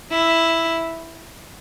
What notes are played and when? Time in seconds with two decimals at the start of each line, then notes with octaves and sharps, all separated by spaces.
0.11 E4